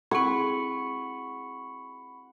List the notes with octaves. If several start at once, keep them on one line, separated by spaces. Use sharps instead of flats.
C4 E4 G#4 F#5 B5 C#6